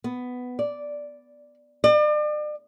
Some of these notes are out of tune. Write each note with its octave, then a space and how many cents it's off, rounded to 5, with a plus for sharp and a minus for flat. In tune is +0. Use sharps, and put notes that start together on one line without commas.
B3 +10
D5 -5
D5 +40